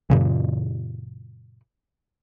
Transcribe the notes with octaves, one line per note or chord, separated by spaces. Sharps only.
F#2 A#2 C#3 E3